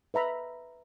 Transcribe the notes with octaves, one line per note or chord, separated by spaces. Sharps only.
B4 E5 A#5 B5